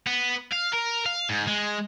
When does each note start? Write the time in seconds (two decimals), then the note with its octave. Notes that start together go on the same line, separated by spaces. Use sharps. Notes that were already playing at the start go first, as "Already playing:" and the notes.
0.07 B3
0.53 F5
0.73 A#4
1.06 F5
1.29 G#2
1.47 G#3